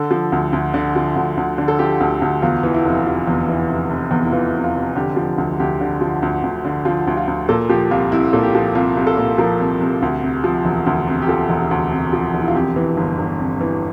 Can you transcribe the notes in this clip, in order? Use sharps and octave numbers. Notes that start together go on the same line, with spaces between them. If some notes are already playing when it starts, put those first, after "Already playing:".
Already playing: D3 A4
F3
D2
D2
D3
F3
D2
D2
D3
A4
F3 G4
D2
D2
E2 F4
E3
E4
F1
F1 F4
E2
E3
F1
F1
E2
E4
E3 F4
F1
F4
F1
D3 G4
F3
D2
D2 G4
D3
F3
D2
D2
D3
F3 F4
D2
F4
D2
A#2 A4
F3 G4
C2 F4
C2 E4
A#2 A4
G4
F3
C2 F4
C2
A4
A#2
F3 A#4
C2
C2
D2
C3
F3
E1
D2
C3
G4
F3 A4
E1
D2
C3
F3
E1
E4
F4
F2 G4
E3
G1
G1
F2
E3